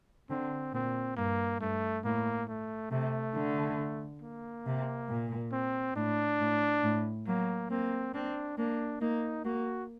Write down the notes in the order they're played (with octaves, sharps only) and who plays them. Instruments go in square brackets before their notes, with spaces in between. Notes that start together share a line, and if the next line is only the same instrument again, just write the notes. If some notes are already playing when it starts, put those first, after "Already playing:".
[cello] D3 [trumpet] C4
[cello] A#2 [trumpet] C4
[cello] G2 [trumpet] A#3
[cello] G2 [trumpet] A3
[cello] A2 [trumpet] A#3
[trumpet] A3
[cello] C3 [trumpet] A3
[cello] D3
[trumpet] A#3
[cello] C3
A#2
[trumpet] C4
[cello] A2 [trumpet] D4
[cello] A2
A2
[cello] F#3 [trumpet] A#3
[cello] A#3 [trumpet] C4
[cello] C4 [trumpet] D4
[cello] A#3 [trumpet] D4
[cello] A#3 [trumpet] D#4
[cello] A#3 [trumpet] F#4